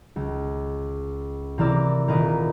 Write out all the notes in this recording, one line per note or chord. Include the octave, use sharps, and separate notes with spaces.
C#2
C3 E3 A#4 D5 E6
D#1 A#4 B4 D#5 D7